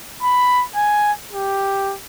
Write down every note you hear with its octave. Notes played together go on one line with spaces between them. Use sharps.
B5
G#5
G4